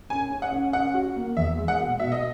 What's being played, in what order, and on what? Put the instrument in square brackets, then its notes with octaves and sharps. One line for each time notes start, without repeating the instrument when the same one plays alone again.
[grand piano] C#4 [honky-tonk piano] G#5
[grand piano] C#4
[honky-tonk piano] F#5
[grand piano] C#4
[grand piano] C#4 [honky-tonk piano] F#5
[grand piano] F#4
A#3
[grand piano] E2 [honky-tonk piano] E5
[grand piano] G#3
[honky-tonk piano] F#5
[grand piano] B2
[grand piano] B2 [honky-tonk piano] E5
[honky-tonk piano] D#5